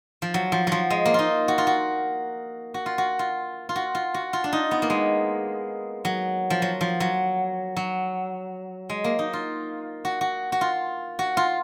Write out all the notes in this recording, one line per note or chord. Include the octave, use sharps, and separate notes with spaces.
F3
F#3
F3
F3 F#3
G#3
A#3
D#4 F4
F#4
F4
F#4
F#4
F4
F#4
F4
F4
F#4
F4
F#4
F4
D4
D#4
B3
A#3
G#3
F#3
F3
F#3
F3
F#3
F#3
G#3
A#3
D#4
F4
F#4
F#4
F#4
F4
F#4
F4